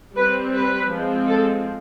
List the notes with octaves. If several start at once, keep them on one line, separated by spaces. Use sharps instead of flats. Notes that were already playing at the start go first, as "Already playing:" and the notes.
G3 C4 B4
B4
F3 G#3 C4
A4